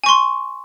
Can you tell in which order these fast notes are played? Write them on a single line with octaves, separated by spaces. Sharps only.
G#5 C#6 C6